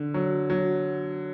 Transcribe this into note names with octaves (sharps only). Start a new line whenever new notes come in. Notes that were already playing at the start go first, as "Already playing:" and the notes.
Already playing: D3
F#3
F#3